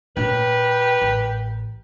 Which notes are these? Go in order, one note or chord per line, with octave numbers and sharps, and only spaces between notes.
A#2 C#4 G4 A#4 B4
A1